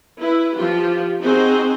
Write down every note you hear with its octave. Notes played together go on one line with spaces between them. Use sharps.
E4 B4
F3 F4 G4
C4 D#4 F#4 G#4 C5